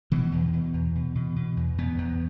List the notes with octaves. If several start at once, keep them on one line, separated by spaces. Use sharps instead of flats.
B2 E3
E2
B2
E2
B2
B2
B2
E2
E2 B3
E2